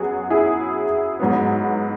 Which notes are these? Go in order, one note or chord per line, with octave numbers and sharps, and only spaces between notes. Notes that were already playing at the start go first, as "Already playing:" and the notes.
Already playing: F#2 F#3 B3 F#4 G#4
E4 G#4
G#2 F#3 B3